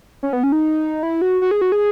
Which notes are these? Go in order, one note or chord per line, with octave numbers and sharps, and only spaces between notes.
C#4
B3
C#4
D#4
E4
F#4
F#4
G#4
F#4
G#4